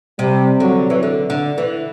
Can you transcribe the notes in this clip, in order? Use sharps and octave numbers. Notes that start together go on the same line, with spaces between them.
C3 G3
D3 F#3
E3
D3
D3
E3